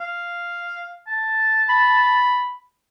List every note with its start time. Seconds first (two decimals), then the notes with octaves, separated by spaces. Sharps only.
0.01 F5
1.07 A5
1.69 B5